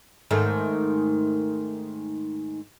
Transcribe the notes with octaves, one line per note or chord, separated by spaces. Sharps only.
G#2 D#3 A3